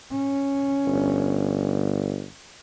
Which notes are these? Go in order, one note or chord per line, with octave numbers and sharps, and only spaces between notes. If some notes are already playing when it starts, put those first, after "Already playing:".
C#4
G1